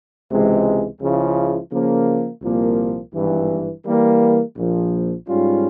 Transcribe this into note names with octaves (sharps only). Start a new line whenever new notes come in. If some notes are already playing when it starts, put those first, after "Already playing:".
C#2 C3 E3 G#3
C#2 C#3 F3 G#3 E4
C#3 F3 A#3
C2 A#2 F3 A#3
G#1 G2 E3
E3 G3 A#3
A#1 A#2 F3
G#2 G3 C#4 F4